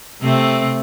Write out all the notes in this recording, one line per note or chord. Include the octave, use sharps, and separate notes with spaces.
C3 A3 C4